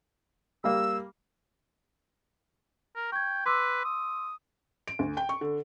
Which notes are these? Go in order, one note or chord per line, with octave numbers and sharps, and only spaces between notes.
G3 A#3 E6
A#4
G5 C#6 G#6
B4 C6 D6 E6
D#6
D7
D2
G5
C#6
D3